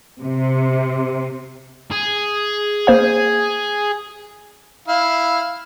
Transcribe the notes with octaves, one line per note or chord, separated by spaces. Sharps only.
C3
G#4
A#3 C5 F5
E4 F5